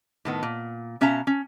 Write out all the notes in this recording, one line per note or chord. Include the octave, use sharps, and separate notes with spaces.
A2 D#3 B3
A#2
B2 C#4 E5 F5 A#5
C#4